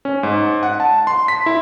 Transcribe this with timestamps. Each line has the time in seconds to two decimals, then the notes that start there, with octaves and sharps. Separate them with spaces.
0.05 C#4
0.23 G#2
0.63 F#5
0.80 A5
1.07 C6
1.28 B6
1.46 E4